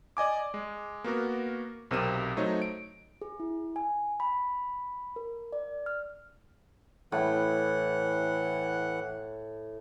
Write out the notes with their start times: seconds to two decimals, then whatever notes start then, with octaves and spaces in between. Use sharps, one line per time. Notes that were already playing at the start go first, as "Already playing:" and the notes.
0.17 D5 D#5 G#5 D6
0.54 G#3
1.04 A#3 B3 F#4 A#4
1.91 B1 C3 C4 A#4 D#7 E7
2.37 F#3 A3 D#4 C5 C#5
2.62 D7
3.22 G#4
3.40 E4
3.76 G#5
4.20 B5
5.16 A#4
5.53 D5
5.86 F6
7.12 A2 E3 F#5